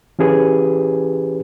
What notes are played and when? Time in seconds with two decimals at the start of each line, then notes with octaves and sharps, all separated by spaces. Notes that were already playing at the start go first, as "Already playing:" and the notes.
0.19 E3 C#4 G4 G#4 B4